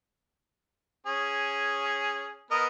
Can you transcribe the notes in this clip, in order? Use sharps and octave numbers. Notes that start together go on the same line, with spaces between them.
C#4 G#4
B3 A#4 D#5